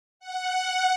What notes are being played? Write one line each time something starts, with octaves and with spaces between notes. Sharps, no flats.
F#5